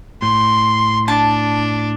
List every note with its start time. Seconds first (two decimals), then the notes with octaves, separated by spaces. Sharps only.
0.22 A2 C6
1.08 D4 A5